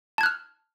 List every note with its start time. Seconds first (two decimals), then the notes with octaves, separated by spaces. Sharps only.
0.18 A5
0.21 G#6
0.23 F#6
0.26 F6